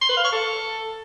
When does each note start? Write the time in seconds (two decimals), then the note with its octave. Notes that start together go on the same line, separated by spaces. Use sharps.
0.01 C6
0.09 B4
0.17 F5
0.25 C#6
0.32 A4